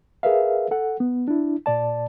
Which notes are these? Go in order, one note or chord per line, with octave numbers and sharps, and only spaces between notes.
G#4 A#4 B4 E5 F5
A4 F#5
B3
D4 E4
A#2 D5 A5